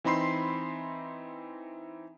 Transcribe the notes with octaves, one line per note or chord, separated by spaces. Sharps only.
E3 C4 D#4 B5 C6 C7